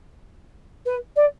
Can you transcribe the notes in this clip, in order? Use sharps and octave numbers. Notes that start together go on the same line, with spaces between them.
B4
D5